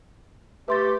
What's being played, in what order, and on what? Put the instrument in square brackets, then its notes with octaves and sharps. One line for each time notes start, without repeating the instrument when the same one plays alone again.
[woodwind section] A3 G4 [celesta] B4 C6 A6